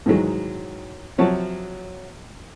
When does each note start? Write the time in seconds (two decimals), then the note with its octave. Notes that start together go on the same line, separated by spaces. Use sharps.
0.06 G#2 D#3 E3 F#3 G#3
1.18 C3 F3 F#3 C#5 F#5 A5